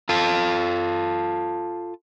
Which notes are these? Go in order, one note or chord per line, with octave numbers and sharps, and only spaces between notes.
F4 A4